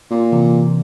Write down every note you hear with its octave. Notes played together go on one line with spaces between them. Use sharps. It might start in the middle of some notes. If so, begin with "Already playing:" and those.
A#2
C3 E3